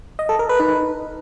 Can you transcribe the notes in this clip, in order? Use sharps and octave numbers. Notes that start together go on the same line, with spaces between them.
D#5
A4
A#4
B4
D#4